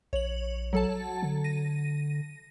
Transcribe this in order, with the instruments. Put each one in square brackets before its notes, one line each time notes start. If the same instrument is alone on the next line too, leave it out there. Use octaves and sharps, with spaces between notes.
[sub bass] A#1 [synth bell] C#5 F#7
[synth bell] F#3 A4 A5
[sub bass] D3
[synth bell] A#6 D#7